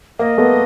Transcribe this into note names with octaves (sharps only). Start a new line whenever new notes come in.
A#3 D#5
A3 B3